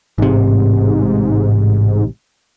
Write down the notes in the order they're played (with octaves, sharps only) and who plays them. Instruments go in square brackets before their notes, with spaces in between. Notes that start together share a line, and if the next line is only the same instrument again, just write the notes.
[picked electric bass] A1 C3 [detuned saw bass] G#2